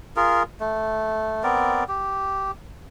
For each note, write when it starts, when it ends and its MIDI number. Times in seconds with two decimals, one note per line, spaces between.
0.16 0.43 65
0.16 0.43 68
0.16 0.43 70
0.60 1.43 57
1.43 1.84 59
1.43 1.84 60
1.43 1.84 70
1.43 1.84 74
1.88 2.51 67